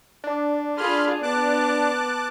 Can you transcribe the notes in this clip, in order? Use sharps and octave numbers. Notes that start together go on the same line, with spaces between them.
D4
F4 G#4 B5 C6 F6
B3 A5 D6 F#6